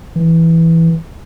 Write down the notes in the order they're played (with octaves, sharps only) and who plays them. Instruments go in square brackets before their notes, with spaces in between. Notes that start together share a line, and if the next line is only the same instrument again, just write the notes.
[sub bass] E3